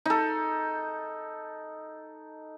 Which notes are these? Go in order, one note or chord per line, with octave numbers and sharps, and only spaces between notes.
D#4 A4